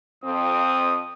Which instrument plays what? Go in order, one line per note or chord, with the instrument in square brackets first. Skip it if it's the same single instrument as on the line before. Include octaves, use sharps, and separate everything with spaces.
[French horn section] F2 C4 [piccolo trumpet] D#6